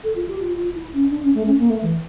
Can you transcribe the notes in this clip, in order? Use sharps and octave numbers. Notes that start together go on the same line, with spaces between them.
A4
F4
G4
F4
F4
E4
C#4
D4
C#4
A3
C#4
A#3
A3
E3